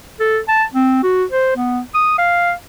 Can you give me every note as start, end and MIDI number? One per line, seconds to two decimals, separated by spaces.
0.20 0.39 69
0.48 0.64 81
0.74 1.00 60
1.03 1.24 66
1.32 1.52 72
1.57 1.81 59
1.95 2.17 87
2.18 2.53 77